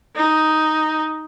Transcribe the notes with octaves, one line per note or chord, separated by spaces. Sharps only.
D#4